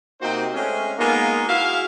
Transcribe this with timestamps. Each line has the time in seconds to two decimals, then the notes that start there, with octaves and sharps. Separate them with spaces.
0.22 C3 A#3 D#4 F#4 C5 G5
0.54 G#3 A3 C4 C#4
0.97 G#3 A#3 B3 D#4 F4 A#4
1.47 E4 F#4 G#4 F5